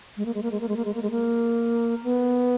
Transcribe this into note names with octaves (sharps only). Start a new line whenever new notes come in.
G#3
A#3
G#3
A#3
G#3
A#3
G#3
A#3
G#3
A#3
G#3
A#3
B3